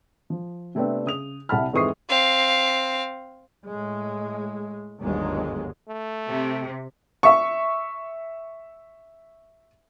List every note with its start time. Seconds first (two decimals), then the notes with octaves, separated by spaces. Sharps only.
0.30 F3
0.75 C3 A3 B3 C4 D4
1.06 C#3 D#6 F7
1.49 C2 C3 F#5 A5 B5 F6
1.73 F2 G#2 E3 C#6 D#6 C7
2.09 C4 F5
3.65 A2 G#3
5.02 G1 D#2 G#2 F#3 G#3
5.88 A3
6.28 C3
7.23 E5 C#6